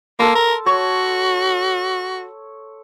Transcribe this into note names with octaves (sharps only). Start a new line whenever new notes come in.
A#3 A4 A5 C6
A#4
F#4 C#5